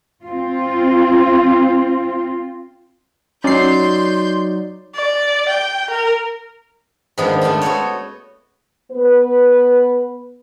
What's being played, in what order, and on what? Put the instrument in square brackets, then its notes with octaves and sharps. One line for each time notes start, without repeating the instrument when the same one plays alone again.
[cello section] C4 F4
[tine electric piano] F#3 D#4 D5 [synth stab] C#4 C7 [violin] C6 G6
[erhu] D5
G5
A#4
[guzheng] G#2 D#3 F3 A#3 B3 D4
A3 B3 D4 F4
B3 F#4 A4 C#5
[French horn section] B3 B4